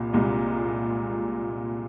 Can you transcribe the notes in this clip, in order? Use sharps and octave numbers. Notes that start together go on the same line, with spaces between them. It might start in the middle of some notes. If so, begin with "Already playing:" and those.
Already playing: C2 A#2
C2 A#2 G#3